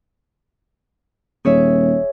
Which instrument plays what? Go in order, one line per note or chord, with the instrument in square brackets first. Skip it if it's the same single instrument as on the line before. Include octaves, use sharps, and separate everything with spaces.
[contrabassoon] D#1 [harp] G#4 C#5 E5